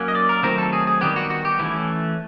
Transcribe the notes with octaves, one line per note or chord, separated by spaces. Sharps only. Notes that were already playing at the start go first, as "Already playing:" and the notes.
Already playing: F#3 A#3 C#4
D#5
D5
A#4
D#3 F#3 A3 C4 A#4
A4
G#4
G#4
D#3 G3 B3 G4
F#4
F#4
G4
E3 A3 C#4 E4